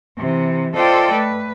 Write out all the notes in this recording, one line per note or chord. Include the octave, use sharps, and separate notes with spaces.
C3 E3
F4 A4 C5 D5 D#5 G5
A3 B4